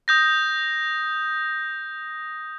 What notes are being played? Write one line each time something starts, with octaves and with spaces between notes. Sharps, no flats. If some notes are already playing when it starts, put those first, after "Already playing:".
D#6 G6 A#6